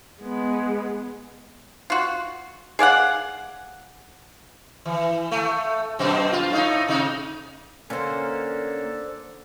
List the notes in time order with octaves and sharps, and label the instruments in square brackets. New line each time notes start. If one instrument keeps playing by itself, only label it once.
[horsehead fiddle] G#3 B3
[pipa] F4 F#4
G#4 D5 F5 F#5
[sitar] E3
A3
F#2 B2 C4
F4
A2 D4 D#4
C3 D#4
[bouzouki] D3 C5 [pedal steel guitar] A#3 C#4 [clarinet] A4